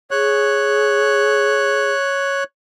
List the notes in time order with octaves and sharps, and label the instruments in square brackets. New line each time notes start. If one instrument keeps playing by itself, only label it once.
[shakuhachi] G#4 [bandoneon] C#5 F#6